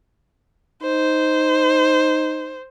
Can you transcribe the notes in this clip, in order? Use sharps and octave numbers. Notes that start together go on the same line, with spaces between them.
D#4 C5